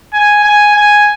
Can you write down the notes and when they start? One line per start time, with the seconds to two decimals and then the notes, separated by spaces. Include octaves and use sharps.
0.14 G#5
0.44 G#5
0.76 G#5